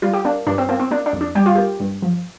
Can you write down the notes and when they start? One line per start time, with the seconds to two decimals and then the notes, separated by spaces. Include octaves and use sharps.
0.02 G3 F4
0.13 G4
0.25 A#3 D4
0.47 G2 D4
0.58 C4
0.69 A#3 C4
0.80 C4
0.91 A#3 D4
1.06 D4
1.13 F2
1.21 D4
1.35 G3 G4
1.46 F4
1.55 A#3 G4
1.80 G2
2.02 F3